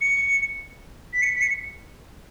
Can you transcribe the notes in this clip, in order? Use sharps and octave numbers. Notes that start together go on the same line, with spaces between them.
C#7
B6
C#7
B6
C#7